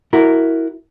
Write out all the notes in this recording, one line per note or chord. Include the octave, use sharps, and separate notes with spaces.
E4 F#4 A#4